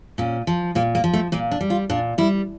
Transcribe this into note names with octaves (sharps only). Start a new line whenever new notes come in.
A#2 C#4
F3
A#2 A#3
A#3
F3
A3
A#2 A#3
D4
G3
F4
A#2 D4
G3 E4